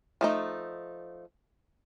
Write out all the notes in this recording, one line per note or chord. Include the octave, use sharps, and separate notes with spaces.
F3 A3 D#4